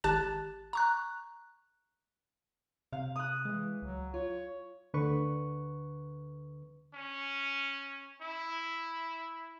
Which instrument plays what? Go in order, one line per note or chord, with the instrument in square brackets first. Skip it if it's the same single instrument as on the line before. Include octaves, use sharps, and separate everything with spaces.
[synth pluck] G#1 G4 A5 F#6 A6 E7
A#5 C#6 F#6
[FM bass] C3 [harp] F5
[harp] D#6 F#6
[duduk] E3 [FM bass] G#3
[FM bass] C#2 [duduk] F#3
[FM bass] F4 [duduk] C#5
[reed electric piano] D2 D3 B4 C#6
[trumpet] C#4
E4